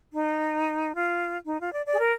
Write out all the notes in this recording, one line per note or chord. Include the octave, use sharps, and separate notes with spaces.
D#4
F4
D#4
F4
D5
D5
G#4
A#4